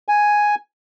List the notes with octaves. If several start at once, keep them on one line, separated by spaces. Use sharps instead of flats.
G#5